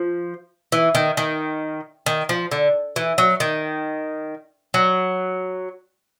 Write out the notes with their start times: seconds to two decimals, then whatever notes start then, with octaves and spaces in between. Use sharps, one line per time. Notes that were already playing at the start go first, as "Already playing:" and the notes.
Already playing: F3
0.72 E3
0.95 D#3
1.17 D#3
2.06 D#3
2.29 F3
2.51 D3
2.96 E3
3.18 F#3
3.40 D#3
4.74 F#3